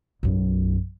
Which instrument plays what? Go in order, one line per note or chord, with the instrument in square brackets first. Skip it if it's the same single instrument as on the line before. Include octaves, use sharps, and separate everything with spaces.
[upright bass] B1 F#2